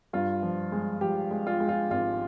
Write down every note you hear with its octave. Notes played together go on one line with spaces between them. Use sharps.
G2 F4
F3
G#3
F3 G4
G#3
F4
G#3
F4
G#1 F4